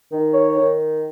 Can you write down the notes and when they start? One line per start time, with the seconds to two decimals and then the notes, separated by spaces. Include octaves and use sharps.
0.11 D#3
0.33 C#5
0.56 D#3